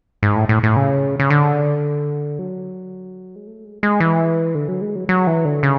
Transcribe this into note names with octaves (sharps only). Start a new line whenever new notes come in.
G#2
A2
A2
A2
C#3
C#3
D3
F#3
G#3
A3
G#3
G#3
E3
D3
F#3
G#3
F#3
F#3
E3
D3
C#3